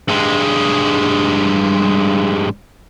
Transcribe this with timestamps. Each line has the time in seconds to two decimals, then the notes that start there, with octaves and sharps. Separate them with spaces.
0.08 G2 G#3